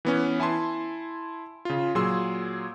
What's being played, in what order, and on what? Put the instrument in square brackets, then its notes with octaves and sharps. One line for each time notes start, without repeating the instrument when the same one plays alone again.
[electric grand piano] E3 B3 C#4
E4 G#5 A5 C6
C#3 F4
A#2 F#3 G#4 C6 E6